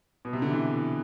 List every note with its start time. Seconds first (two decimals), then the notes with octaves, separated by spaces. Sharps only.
0.25 B2
0.33 C3
0.42 D3
0.51 E3